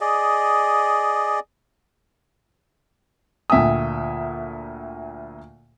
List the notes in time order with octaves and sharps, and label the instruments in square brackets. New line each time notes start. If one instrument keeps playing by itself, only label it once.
[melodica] G#4 D5 D#5
[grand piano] D2 A#2 E5 G5 G#5 D#6